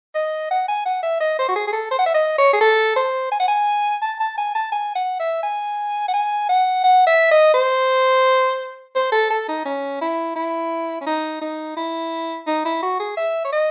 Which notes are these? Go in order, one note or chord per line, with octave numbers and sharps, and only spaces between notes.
D#5
F#5
G#5
F#5
E5
D#5
C5
F#4
G#4
G#4
A4
C5
F#5
E5
D#5
C#5
G#4
A4
C5
G#5
F#5
G#5
A5
A5
G#5
A5
G#5
F#5
E5
G#5
F#5
G#5
F#5
F#5
E5
D#5
C5
C5
A4
A4
D#4
C#4
E4
E4
C#4
D#4
D#4
E4
D#4
E4
F#4
G#4
E5
C#5
D#5